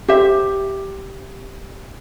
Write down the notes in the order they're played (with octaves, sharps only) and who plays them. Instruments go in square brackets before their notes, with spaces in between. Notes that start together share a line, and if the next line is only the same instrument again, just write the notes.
[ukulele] G4 C5 E5